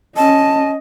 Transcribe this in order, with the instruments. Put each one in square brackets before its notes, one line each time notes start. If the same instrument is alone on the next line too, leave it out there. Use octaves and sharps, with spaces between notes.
[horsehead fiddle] C#4 D#5 [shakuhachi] A5